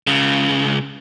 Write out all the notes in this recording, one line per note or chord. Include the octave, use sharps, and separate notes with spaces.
C#2 C#3